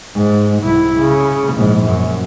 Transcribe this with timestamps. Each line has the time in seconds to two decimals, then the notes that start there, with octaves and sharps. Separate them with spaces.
0.15 G#2
0.63 C2 E4
0.98 C#3
1.53 A#1 G#2
1.85 F#2